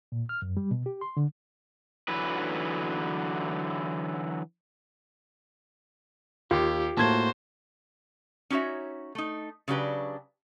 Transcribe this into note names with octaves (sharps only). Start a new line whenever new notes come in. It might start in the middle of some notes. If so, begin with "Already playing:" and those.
A#2
F6
F#2
G3
B2
G4
C6
D3
D3 E3 F#3 B4
D#2 F4 G4
A2 A#3 F#4 C5 A5 G#6
C#4 D#4 F#4 C#5 E5
A3 D#4
C#3 F#3 D4 G4 B4